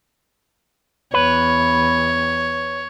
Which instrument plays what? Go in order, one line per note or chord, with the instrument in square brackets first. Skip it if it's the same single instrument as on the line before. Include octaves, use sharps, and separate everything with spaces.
[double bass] E2 [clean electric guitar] B4 [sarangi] C#5